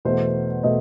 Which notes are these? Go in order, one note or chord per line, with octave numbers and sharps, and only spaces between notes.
E2 B2 A3 C5
B2 A3 D#5